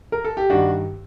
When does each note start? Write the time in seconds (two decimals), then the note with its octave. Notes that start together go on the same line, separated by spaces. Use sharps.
0.12 A#4
0.24 A4
0.37 G4
0.50 G2 D#3 D4 F#4